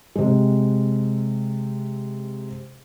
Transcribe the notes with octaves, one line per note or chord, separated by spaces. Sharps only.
C3 G#3